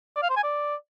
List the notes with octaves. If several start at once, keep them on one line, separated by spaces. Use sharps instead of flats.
D5
F5
C5
G#5
D5